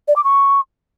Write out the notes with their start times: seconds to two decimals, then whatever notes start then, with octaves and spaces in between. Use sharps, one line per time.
0.08 D5
0.16 D6
0.24 C#6